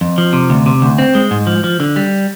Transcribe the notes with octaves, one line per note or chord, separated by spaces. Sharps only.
F2
F3
C3
D2
C3
D2
C4
G#3
G#2
F3
F3
D3
G3